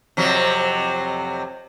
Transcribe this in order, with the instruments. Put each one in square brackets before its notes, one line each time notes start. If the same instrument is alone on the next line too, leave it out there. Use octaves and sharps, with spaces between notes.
[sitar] F2 C3 F#3